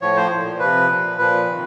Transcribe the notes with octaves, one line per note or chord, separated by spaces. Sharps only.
A2 F3 C#5
C5
A#2 F3
C3 F3 B4
A#2 F3
A#2 F3 B4
C3 D#3